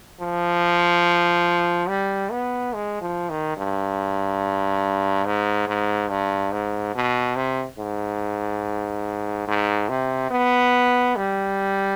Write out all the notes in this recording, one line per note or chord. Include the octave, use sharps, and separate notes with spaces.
F3
G3
B3
G#3
F3
D#3
G2
G#2
G#2
G2
G#2
B2
C3
G#2
G#2
C3
B3
G3